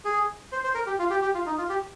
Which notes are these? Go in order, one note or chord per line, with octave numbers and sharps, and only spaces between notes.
G#4
C5
C5
A#4
G4
F4
G4
G4
F4
D#4
F4
G4